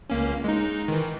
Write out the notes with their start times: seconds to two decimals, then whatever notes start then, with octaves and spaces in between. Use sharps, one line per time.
0.10 C#2 A#3 C#4
0.44 G#3 D#4
0.88 D#3 E3